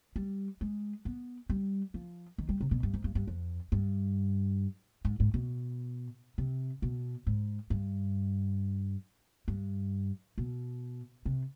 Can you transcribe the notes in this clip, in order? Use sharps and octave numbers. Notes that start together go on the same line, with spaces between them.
G3
G#3
B3
G3
F3
D#3
G3
C3
B2
G2
G#2
G2
G2
F2
G2
G#2
G#2
B2
C3
B2
G#2
G2
G2
B2
C3